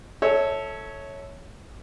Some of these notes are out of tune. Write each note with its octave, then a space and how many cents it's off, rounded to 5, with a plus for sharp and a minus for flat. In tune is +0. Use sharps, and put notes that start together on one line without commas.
A4 +0 C#5 +0 E5 -30